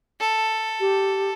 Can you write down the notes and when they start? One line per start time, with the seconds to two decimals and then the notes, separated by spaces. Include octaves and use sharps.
0.20 A4
0.80 G4